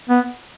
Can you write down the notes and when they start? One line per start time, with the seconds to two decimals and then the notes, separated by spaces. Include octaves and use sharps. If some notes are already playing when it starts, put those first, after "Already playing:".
0.09 B3